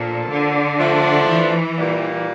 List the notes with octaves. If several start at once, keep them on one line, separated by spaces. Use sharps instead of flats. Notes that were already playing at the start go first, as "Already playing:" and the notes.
Already playing: A#2 F3 A#3 D4 A4
D3
F3 A3 D4
E3
A#2 G3 A#3